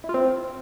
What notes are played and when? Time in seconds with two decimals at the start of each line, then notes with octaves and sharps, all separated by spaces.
0.04 E4
0.09 F4
0.14 C4